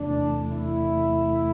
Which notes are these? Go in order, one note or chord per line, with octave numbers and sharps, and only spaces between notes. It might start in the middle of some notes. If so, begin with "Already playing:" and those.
Already playing: E2 C3 E3 A3 D4
E4